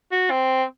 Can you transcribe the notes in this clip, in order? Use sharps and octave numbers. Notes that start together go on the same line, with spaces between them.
F#4
C4